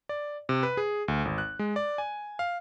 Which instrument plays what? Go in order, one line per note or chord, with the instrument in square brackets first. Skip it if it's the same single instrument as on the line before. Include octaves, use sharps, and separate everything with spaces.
[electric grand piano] D5
C3
B4
G#4
D2
G#1
F#6
G#3
D5
G#5
F5